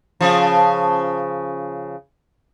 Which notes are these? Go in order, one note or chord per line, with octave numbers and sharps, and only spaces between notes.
C#3 F3